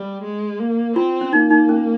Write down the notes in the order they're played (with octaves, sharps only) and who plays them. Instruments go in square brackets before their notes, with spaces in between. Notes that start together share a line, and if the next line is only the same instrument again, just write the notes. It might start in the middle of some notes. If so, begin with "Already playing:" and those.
Already playing: [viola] G3
G#3
A#3
[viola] C4 [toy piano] F4
[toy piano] C#4
[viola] A#3 [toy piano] D#4
[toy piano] D#4
C#4